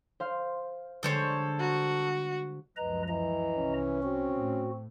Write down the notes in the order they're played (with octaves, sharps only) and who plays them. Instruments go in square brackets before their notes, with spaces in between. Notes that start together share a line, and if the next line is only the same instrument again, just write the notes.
[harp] C5 F5
[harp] D3 G3 G#3 [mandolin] A4 C5 C#5
[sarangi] F#4 [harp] A#5
[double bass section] C#2 F#2 F3 [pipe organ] B4 D#5 A#5
[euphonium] E3 [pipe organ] D#5 A#5
[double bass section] C2 [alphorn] C#4
[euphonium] C4 [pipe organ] F#4
[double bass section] A2